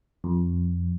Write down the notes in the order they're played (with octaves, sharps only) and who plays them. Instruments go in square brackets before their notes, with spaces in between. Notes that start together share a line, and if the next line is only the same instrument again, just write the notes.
[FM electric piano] F2